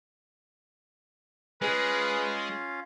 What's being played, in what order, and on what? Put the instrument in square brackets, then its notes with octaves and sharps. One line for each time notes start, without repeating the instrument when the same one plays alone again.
[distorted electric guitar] G#3 [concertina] C#4 F4 F5 [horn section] G#4 B4